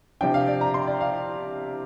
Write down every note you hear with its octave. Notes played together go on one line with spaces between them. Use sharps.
C3 F3 D4 G5
F5
D5
A#5
C6
D5
F5